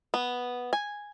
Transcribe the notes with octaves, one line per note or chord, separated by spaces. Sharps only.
B3
G#5